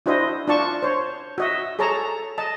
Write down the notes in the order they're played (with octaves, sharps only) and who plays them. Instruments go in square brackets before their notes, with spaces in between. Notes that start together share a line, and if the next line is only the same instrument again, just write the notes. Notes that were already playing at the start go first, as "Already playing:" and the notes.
[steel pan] D4 E4 F#4 C5 D#5
D4 F4 D5 A5 C#6
C5 C#5
F#4 D#5 E5
G#4 A4 C#5 A5 A#5
D#5 A5